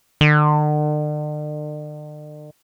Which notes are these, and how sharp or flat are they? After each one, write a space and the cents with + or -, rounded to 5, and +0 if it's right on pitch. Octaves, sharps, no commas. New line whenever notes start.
D3 +45